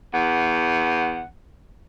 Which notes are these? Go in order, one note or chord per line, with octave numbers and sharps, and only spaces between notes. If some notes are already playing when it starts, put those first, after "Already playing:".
E2 F#5